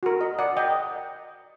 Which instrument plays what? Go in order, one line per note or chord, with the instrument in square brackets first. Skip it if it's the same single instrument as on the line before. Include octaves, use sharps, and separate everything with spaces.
[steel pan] F#4 A#4
D#5
D5 F#5
D#5 G5